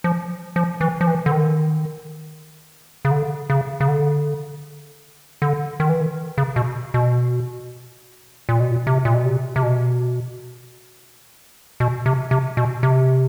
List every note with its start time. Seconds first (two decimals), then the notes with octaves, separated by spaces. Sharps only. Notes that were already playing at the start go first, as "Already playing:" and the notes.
0.04 F3
0.56 F3
0.81 E3
1.01 F3
1.07 E3
1.26 D3
1.32 D#3
3.05 C#3
3.11 D3
3.50 C#3
3.80 C#3
3.88 D3
5.42 D3
5.80 D#3
5.89 E3
6.01 D#3
6.38 C#3
6.56 B2
6.94 B2
8.49 A#2
8.60 B2
8.71 A#2
8.87 C3
9.05 A#2
9.14 B2
9.25 C3
9.56 C3
9.63 B2
11.80 B2
12.06 C3
12.31 C3
12.57 B2
12.83 C3